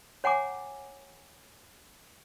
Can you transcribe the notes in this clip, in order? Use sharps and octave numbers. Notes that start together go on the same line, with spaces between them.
C#5 F#5 G#5 A#5 D6